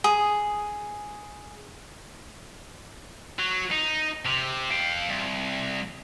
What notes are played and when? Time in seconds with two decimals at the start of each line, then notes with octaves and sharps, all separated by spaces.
0.04 G#4 D#6
3.39 F#3
3.71 D#4
4.26 C3
4.71 F5 G5
5.09 C2